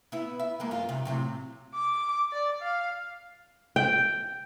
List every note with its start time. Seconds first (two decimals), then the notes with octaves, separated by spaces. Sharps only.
0.12 B3 E4
0.39 E5
0.60 G#3 A#3 B3
0.71 F#2 F4
0.89 G#2 C3 D#3
1.05 A2 C3 F#3
1.74 D6
2.32 D5
2.62 F5
3.76 G5